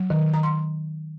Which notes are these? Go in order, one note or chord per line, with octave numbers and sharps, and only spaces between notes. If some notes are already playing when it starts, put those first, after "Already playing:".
Already playing: F#3
D#3
D#3 A#5
C6